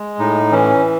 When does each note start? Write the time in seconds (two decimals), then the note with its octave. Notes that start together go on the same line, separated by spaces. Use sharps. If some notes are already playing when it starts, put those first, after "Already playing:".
Already playing: G#3
0.19 A2 D#4
0.52 E3 C#4